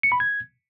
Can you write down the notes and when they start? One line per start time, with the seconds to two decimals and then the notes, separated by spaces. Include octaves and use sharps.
0.03 C#7
0.12 B5
0.20 G#6